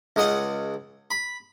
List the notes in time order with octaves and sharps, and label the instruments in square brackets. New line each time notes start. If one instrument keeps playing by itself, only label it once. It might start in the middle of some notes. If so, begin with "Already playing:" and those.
[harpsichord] C#2 D#5 F#5
B5